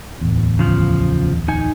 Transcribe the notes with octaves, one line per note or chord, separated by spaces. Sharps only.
D1 A1 E2
C#3 F3
D#4 G#5